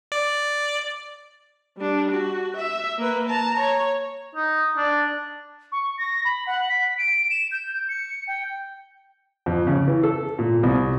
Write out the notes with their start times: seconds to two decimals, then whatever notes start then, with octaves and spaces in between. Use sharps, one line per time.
0.12 D5
1.77 G3 D4
2.12 F#4
2.57 E5
2.98 A#3 B4
3.29 A5 A#5
3.60 C#5
4.35 D#4
4.77 D4
5.72 C#6
5.98 A#6
6.25 B5
6.47 F#5
6.69 B6
6.98 D7
7.30 E7
7.52 G6
7.89 C#7
8.27 G5
9.46 F2
9.67 C#3
9.88 E3
10.03 A4
10.39 A#2
10.63 C2